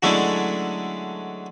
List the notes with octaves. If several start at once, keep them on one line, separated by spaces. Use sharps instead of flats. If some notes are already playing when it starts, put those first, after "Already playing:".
D3 F#3 G#3 A3 C#4 E4